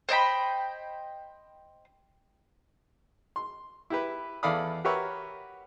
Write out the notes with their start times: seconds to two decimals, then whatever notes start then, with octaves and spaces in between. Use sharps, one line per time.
0.09 C5 D#5 G5 B5
3.36 C6
3.90 E4 G4 B4
4.43 E2 A4 D5 F5 B5 D#6
4.84 F#4 G4 A#4 B4 C#5 E5